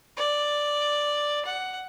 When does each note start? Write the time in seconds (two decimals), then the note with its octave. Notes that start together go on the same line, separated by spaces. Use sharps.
0.17 D5
1.45 F#5